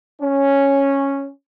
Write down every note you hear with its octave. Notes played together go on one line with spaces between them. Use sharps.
C#4